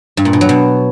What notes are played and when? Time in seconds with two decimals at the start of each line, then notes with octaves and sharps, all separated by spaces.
0.17 G2
0.25 A#2
0.33 B2
0.41 F#3
0.49 B2